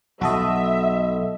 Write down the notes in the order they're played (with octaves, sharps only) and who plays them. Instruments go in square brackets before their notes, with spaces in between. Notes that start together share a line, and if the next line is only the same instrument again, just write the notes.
[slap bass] B1 [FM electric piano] F#4 A4 D#5 [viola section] E5